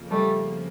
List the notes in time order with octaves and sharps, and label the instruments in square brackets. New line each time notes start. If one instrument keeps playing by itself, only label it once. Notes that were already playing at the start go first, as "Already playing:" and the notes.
Already playing: [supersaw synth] F2 C#3 F3 A#3
[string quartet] G3 A3